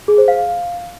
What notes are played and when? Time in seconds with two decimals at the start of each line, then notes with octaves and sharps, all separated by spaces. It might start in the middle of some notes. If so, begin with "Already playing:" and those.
0.08 G#4
0.18 C5
0.28 F5